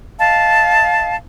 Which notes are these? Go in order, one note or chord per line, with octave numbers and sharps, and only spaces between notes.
D#5 F5 A5